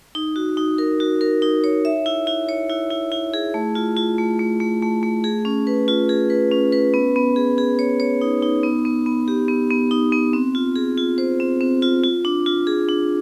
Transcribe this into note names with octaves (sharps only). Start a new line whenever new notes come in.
D#4
F#4
D#4
A#4
F#4
A#4
D#4
C#5
E5
E4
E4
C#5
E4
E4
E4
G#4
A3
F4
F4
A3
A3
A3
A3
A3
G#4
C#4
B4
F4
G#4
B4
C#4
B4
B3
B3
G#4
G#4
C#5
C#5
D#4
D#4
B3
B3
B3
G4
B3
B3
D#4
B3
C4
F4
G#4
F4
C5
C4
C4
F4
F4
D4
F4
G#4
D4